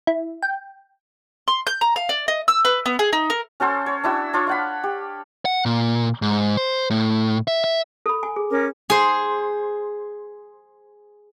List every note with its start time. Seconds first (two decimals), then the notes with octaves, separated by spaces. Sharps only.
0.07 E4
0.43 G5
1.48 C6
1.67 G6
1.81 A#5
1.96 F5
2.09 D5
2.28 D#5
2.48 E6
2.65 B4
2.86 B3
2.99 G#4
3.13 D#4
3.30 A#4
3.60 C#4 F#4 A4 C5
3.86 C#5
4.04 D4 E4 F#4 E6
4.33 D4 F4 C#5
4.47 F5 F#5 B5
4.84 G4
5.45 F#5
5.66 A#2
6.22 G#2
6.57 C5
6.90 A2
7.48 E5
7.64 E5
8.06 A4 B5
8.23 G#5
8.36 G#4
8.50 C#4 A#4 D6
8.90 G#4 C5